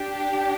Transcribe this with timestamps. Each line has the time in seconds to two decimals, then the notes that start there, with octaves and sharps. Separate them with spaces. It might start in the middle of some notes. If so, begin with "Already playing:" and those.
Already playing: D4 G4